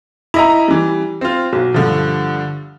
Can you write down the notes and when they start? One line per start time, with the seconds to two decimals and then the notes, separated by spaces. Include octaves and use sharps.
0.34 E4 D#5 A#5
0.68 E3 G3
1.21 C4 F4
1.53 B1 F#3
1.74 G2 D3 F3